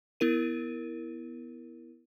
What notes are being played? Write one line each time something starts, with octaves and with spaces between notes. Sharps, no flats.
B3 E4 A#4 D#7